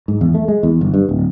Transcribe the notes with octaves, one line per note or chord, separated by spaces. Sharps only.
G#2
E2
A3
G#3
E2
G1
G2
D1